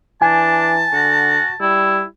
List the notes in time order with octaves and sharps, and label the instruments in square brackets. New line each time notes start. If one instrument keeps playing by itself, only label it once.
[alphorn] E3 [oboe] D4 [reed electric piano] G#5 [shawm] A5
[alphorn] D3 [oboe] F#4
[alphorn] G3 [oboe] E4